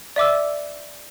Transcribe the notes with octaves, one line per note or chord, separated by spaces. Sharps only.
D5 E5 D6 E6